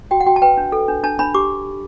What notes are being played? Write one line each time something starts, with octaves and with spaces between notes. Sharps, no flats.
F#4 G5
F#5
F#4 G5
A5
B4 G5
D4
A4
D4
D4 A5
D4 B5
G4 D6